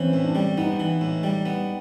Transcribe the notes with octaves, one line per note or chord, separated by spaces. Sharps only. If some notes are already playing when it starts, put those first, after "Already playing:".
Already playing: E3 C4 C#4
A2
D4
G3
B3 D#4
E3
A2
G3
B3